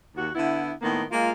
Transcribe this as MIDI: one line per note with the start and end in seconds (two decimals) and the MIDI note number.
0.15 0.29 39
0.15 0.29 66
0.34 0.71 50
0.34 0.71 59
0.34 0.71 64
0.81 1.02 45
0.81 1.02 51
0.81 1.02 58
0.81 1.02 59
1.11 1.31 56
1.11 1.31 58
1.11 1.31 65